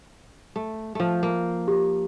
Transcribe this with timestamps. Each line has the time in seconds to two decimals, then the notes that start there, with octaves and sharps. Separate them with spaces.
0.56 A3
0.95 F3 A3
1.23 A#3
1.68 G4